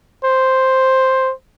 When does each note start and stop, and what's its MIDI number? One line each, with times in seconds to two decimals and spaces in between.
0.25 1.33 72